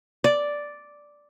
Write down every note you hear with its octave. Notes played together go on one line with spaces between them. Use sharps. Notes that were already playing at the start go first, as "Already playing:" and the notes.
D5